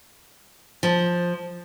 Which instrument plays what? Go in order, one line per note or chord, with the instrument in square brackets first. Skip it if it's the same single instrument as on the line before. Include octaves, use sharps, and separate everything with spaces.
[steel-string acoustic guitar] F3